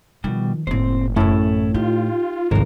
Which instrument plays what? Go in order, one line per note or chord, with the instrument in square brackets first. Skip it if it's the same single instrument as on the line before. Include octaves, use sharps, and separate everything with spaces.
[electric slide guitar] B2 G3 [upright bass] D#3 F3
[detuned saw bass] F#1 [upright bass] A2 A#3 [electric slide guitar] C4 C5
[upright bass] A1 F#2 [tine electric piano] A2 [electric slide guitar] C#4 E4 A4
[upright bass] D#4 [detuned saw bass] F4 [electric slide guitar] G4
[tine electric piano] G#1 [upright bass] C#2 G2 [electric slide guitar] C3 F3 A#4